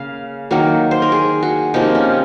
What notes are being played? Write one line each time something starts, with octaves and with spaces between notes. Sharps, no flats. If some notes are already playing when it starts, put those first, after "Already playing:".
Already playing: C#3 A#3 F5
D#3 F#3 A#3
C5
A#4
G#4
F#4
C3 F3 A#3 D#4
C#4